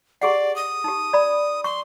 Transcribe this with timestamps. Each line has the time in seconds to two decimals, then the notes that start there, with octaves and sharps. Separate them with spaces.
0.22 G4 G#4 D5 F#5
0.56 D#6
0.84 D#4 G4
1.13 D5 B5
1.64 C6 C#6